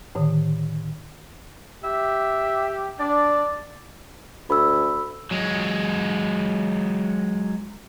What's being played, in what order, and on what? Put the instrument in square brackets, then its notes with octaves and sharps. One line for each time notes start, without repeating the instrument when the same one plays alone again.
[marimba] A2 D3 D#3
[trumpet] G4 [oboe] E5
[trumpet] D4 [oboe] D5
[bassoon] D2 [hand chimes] B5 E6
[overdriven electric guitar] F#3 G#3